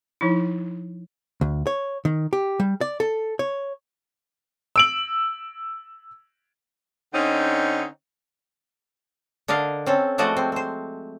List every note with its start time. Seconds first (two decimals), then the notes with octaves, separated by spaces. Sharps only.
0.21 F3 D#4 E4
1.41 D2
1.67 C#5
2.05 D#3
2.33 G4
2.60 G3
2.81 D5
3.00 A4
3.39 C#5
4.76 E6 D7 F#7
7.14 D3 C4 C#4 D#4
9.48 D3 D4 A#4 D#5 F5
9.86 C4 C#4 A4
10.18 F3 G#3 A3 F#4 D5 D#5
10.37 C4
10.52 C4 C5